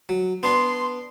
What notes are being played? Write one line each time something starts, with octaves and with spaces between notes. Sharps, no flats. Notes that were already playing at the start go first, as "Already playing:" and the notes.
F#3
B3 D4 C6